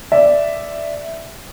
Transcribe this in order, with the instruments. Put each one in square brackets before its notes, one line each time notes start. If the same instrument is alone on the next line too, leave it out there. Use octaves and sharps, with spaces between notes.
[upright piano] D5 E5